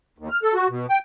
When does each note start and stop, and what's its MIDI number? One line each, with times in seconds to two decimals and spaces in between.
0.18 0.29 39
0.30 0.42 89
0.43 0.54 69
0.55 0.68 66
0.69 0.86 47
0.90 0.99 79